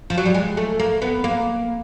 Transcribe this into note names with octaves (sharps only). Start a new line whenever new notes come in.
F3
F#3
G3
G#3
A3
A#3
B3
A#3